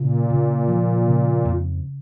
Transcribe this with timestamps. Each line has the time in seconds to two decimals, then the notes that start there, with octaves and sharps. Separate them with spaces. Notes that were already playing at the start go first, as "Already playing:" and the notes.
Already playing: A#2 C#3
0.30 C#3
0.68 F3
1.06 C#3
1.45 F2